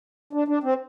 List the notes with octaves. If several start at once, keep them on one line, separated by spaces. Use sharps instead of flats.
D4
D4
C4